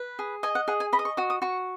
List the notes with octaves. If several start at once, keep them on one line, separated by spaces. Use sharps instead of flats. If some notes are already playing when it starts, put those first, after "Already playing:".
Already playing: B4
G#4
D#5 G#5
F#5
G#4 F#5
G#5
D#5 B5
D#6
C#6
F#4 D#6
D#6
F#4 C#6